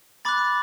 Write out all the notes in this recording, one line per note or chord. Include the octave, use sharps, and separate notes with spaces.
B5 D6 F#6 A6